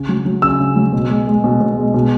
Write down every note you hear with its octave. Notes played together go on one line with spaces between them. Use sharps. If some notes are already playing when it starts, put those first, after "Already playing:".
Already playing: C#3
F#3
F#3
C#3 E6
C#3
F#3
B2
G#3
G#3
B2
B2
G#3
B2